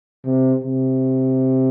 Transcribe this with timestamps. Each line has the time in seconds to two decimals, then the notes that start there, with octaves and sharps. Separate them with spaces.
0.24 C3
0.64 C3